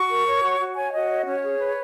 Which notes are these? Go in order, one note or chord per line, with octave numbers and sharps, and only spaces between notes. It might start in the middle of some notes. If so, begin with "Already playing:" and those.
Already playing: F#4 C#6
A#4
C#5
F#4
F#4
C#5 G#5
F#4 D#5
C#5
C#4 C#5
G#4
B4